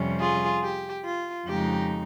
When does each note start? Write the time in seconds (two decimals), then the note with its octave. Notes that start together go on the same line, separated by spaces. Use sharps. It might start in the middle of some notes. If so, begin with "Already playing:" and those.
Already playing: F2 C3 G3 C#4
0.20 F4 G#4
0.63 G4
1.05 F4
1.47 F2 C#3 G#3 D#4 G4